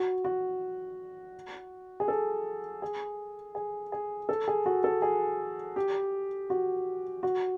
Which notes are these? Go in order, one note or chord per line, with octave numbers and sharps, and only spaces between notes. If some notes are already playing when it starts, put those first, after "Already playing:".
Already playing: F#4
F#4
G#4
A4
G#4
G#4
G#4
A4
G#4
F#4
A4
G#4
G4
F#4
F#4